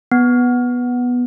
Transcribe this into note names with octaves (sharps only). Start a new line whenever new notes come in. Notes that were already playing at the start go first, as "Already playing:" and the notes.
B3